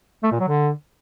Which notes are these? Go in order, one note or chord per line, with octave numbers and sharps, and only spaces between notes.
A3
A#2
F#3
D3